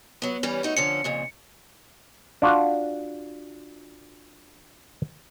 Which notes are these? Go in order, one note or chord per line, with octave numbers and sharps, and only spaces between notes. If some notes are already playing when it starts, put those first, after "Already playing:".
F#3 B3
E3 G3 C#4
A3 D#4 F#4
D3 F3 C#4 C#7
F2 A#2 C#3
D4 F4 F#4